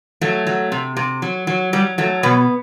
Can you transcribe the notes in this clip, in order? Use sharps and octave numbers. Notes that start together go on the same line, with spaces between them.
F#3 A3
F#3
C3
C3
F#3
F#3
F#3 G3
F#3 A3
B2 B3